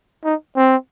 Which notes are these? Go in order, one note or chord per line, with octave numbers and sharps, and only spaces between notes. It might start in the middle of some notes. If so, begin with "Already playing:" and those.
D#4
C4